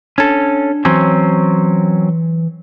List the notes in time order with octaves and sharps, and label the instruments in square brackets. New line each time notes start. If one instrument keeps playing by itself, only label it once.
[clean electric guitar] C#4 A4 [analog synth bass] D4
[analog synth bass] E3 [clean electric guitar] F#3 C4 C#4